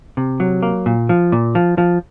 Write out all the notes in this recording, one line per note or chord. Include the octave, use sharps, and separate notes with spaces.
C3
F#3
A#3
A#2
F3
A#2
F3
F3